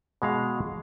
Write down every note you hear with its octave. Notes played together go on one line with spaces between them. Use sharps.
B2 G#3 F5